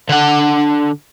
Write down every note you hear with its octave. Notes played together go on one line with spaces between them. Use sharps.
D3 F#5